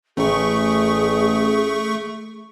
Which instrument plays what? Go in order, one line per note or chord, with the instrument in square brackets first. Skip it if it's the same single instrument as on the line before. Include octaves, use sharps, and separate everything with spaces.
[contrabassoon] A1 [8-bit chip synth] A3 C#6 [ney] G#4